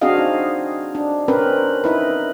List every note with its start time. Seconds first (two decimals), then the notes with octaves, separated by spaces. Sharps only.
0.01 C4 D4 F#4 G#4 D#5 F5
0.18 D#4
0.95 D4
1.28 C4 C#4 A#4 B4
1.84 D#4 E4 B4